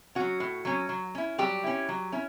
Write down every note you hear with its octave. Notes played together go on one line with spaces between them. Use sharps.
F#3 C#4 F#4
A2
F#3 C#4
F#3
C#4 E4
F#3 G3 G4
C#4 E4
F#3
C#4 E4